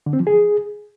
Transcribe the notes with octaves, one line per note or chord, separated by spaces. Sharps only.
D3
C4
F3
G#4